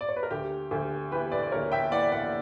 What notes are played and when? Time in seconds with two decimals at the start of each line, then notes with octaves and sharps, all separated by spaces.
0.01 D5
0.09 C#5
0.16 B4
0.23 A#4
0.31 D2 G4
0.71 D2 G4
1.12 E3 G4 B4
1.32 B4 D5
1.43 D5
1.52 D2 A#4 C#5
1.72 E5 G5
1.92 E3 D5 F#5
2.12 D5 F#5